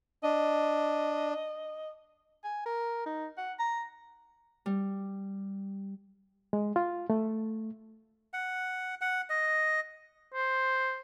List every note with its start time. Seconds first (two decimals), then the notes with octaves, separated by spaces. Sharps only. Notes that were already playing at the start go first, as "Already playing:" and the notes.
0.23 D4 D#5
2.44 G#5
2.66 A#4
3.06 D#4
3.37 F#5
3.59 A#5
4.66 G3
6.53 G#3
6.76 F4
7.10 A3
8.33 F#5
9.01 F#5
9.30 D#5
10.34 C5